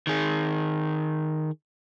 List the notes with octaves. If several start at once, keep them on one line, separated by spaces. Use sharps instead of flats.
D#3 G#4